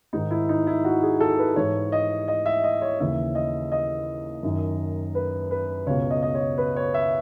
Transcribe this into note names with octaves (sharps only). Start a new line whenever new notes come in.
G#2 D#3 D#4
E4
D#4
E4
F#4
G#4
A4
B4
G#2 E3 C#5
D#5
D#5
E5
D#5
C#5
D#2 C#3 E3 E5
D#5
D#5
F#2 D#3
B4
B4
C#2 B2 C#5
D#5
D#5
C#5
B4
C#5
E5